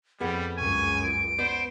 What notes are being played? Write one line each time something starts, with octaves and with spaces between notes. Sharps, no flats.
F2 G3 B3 G#4 F#5 B5
C#2 F#2 G#5 C#6
D7
B3 C5 D5